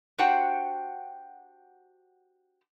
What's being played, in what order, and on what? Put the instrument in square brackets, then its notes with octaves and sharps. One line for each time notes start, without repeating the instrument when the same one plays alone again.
[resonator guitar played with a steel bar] D4 F#4 G4 C5 F#5 G5